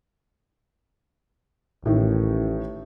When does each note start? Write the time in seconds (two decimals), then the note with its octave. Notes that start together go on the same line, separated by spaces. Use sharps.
1.85 A1 A2 D#3